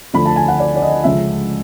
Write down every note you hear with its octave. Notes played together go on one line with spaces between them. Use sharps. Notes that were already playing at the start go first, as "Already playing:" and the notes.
D2 D3 F3 B5
A5
G#5
F#5
D5
D5
D#5
C#2 C#3 F3 E5